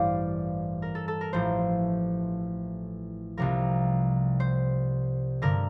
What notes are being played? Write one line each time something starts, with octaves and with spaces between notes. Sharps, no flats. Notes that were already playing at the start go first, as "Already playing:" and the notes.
Already playing: A1 G2 E3 G3 C5 D5 F5
A#4
A4
A4
A#4
A1 A2 F3 C5
C2 C3 F3 A#4
C5
G2 D3 A#4